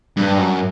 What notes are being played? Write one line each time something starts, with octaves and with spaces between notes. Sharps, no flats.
G2
F#2